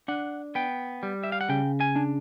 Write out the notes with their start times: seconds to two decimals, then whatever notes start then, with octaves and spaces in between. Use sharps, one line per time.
0.08 D4 F#5
0.55 B3 G5
1.03 G3
1.24 E5
1.32 F5
1.41 F#5
1.49 C#3 G5
1.80 G#5
1.96 D4